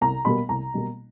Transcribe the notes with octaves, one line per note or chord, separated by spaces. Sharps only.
C2 A#5
B2 G3 A#3 B5
C2 A#5
B2 G3 A#3